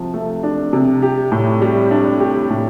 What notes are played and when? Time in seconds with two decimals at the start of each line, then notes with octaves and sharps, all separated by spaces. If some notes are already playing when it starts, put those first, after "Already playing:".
Already playing: C3 F3
0.14 A3
0.43 D4
0.73 C3
1.02 G4
1.32 A2
1.61 G3
1.91 D4
2.20 G4
2.50 A2